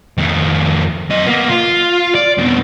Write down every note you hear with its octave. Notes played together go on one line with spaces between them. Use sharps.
F2 D#3
F#2 D#5
A#3 B3
F4
D5
F2 B2